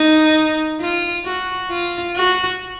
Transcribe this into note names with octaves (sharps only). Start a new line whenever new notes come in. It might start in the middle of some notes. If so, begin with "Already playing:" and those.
Already playing: D#4
F4
F#4
F4
F#4